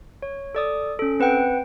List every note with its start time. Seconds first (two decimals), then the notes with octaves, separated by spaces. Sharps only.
0.22 C#5
0.55 A4 D5 D#6
0.99 C#4 A4
1.20 C4 B4 F#5 G5